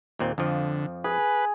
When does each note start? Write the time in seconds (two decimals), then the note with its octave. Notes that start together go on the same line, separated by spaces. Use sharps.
0.19 D#2 A#2 C4
0.38 F2 D3 F3
1.04 G#4 B4